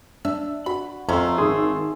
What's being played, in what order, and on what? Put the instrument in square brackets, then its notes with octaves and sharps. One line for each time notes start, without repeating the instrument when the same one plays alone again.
[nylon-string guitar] D4 [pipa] E5
[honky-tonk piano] F#4 [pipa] B5
[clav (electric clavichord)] F2 [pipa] A3 C#4 [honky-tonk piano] A#5 C6 E6
[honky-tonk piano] G#1 C6 [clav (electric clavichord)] G#4